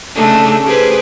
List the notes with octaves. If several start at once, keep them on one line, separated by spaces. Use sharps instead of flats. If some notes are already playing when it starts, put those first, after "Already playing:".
C#3 A3 D4 D#4
G4 G#4 B4 C5